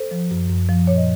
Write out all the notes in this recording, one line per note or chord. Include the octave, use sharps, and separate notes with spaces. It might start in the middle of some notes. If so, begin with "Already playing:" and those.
Already playing: A4 C5
F3
F#2
F#2
F3
A#2 C#5
D#5